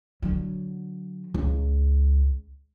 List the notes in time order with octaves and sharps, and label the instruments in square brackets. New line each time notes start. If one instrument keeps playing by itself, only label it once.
[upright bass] D3 F#3
C#2